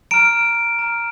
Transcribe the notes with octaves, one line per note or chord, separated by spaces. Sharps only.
A#5 F6 D7
A#5 F6